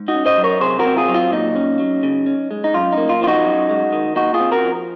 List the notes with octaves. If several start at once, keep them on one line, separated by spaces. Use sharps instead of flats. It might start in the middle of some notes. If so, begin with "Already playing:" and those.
Already playing: G#2
D#4 F#4
C#4
C5 D#5
F#3
A#4 C#5
C3 G#4 C5
F#4 A#4
C4
F4 G#4
F#3
F4
A#2 D#4
C#4
F#3
C#3
C#4
G#3
D#4
F#2 F4
A#3 D#4
F4
F3 F4
D#4 F#4
F#2
G#3
D#3
A#2 D#4 F#4
F4 G#4
C4
F#4 A#4
F3